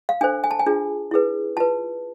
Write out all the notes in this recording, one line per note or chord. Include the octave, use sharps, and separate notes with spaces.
F5
D4 A4 C5 G#5
G#5
A5
G#5
D4 F4 G#4
E4 G#4 B4
F4 B4 A5